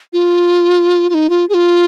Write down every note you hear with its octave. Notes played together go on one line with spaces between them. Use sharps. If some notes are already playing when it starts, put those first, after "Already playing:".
F4
F4
D#4
F4
G#4
F4